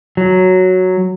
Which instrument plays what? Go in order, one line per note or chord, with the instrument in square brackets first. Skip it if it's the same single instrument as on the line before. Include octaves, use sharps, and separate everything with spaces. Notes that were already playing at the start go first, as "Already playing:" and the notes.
[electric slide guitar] F#3